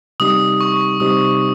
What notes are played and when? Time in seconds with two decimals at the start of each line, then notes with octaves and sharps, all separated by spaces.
0.20 C3 G3 C4 D#4 G4 D#6
0.61 C#6
1.00 C3 G3 C4 D#4 G4 D#6